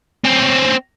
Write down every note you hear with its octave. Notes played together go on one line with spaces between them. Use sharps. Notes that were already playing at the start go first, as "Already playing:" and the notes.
C4 C#4